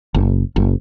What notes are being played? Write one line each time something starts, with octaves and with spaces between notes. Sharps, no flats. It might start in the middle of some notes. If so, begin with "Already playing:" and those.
F#1
F#1